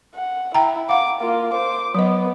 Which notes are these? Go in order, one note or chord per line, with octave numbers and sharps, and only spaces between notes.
F#5
E4 G5 A#5
F5 F#5 D6
A#3 F4
C5 D6
F#3 B3 D#5